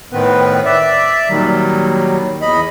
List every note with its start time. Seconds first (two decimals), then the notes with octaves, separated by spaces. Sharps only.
0.12 A2 D#3 B3 C4 B4
0.65 D5 E5
1.29 A#2 D#3 F#3 G3
2.41 E2 D#5 B5